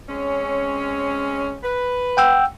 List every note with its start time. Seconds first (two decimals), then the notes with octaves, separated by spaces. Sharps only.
0.08 G#3 C4 C#4
1.63 B4
2.17 F#5 G5 E6